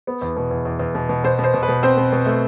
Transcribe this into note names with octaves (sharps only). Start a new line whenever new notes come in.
B3
E2
B2
E2
E2
E2
B2
B2
B2 C5
B2 C5
B2
B4
B2
C4 C5
B2
B2
A3